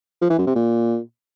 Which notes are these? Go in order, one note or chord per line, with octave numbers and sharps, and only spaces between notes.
F3
E3
F#2
C3
A#2